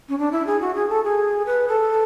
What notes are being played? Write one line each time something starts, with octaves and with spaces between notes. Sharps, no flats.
C#4
D4
E4
G#4
F#4
G#4
A4
G#4
B4
A4